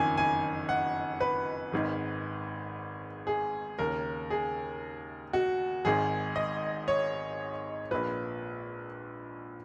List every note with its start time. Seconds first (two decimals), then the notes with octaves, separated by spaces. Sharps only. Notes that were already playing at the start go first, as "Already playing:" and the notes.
Already playing: F#1 F2 D#3 G#5
0.17 G#5
0.69 F#5
1.20 B4
1.72 G#1 G#2 D#3
3.27 G#4
3.79 D#2 C#3 A#4
4.30 G#4
5.33 F#4
5.85 G#1 G#2 D#3 G#4
6.36 D#5
6.88 C#5
7.91 A#1 A#2 B4